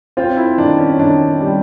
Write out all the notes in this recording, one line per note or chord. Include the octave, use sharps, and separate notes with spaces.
C4 F4
E4
D#3 D4
C#4
D#3 D4
G3